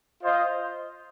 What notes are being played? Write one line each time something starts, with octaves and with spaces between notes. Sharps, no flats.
F4 C5 D#5